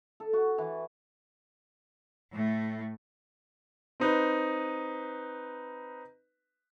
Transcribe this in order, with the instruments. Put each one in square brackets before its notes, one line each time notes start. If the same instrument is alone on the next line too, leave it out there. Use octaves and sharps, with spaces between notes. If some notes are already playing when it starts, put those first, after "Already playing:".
[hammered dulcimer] A4
F#4
E3
[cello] A2 A3
[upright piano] C4 D#4 B4